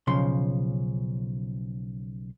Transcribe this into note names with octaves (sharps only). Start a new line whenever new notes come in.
B1 C#3 F3 C6